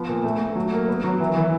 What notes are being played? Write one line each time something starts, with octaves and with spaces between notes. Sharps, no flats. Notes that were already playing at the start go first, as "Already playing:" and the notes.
Already playing: F3 B3
A#2
A3
A3
F#3
A#3
B3
F#3
E3
E3